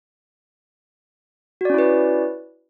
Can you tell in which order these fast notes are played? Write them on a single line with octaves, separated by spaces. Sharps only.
F#4 D5 C#4 E4 B4